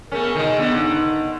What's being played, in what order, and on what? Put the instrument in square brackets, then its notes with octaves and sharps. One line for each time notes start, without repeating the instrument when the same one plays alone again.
[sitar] A3 C#4 [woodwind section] B3 G#4 A#4
[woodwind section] B2 D3 G#4 [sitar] D#3 G#3
[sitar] D3 D#3 [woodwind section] B3
[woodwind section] G2 C#3 D#4